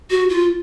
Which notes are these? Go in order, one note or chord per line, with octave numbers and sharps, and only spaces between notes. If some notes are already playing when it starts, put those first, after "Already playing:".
F#4
F4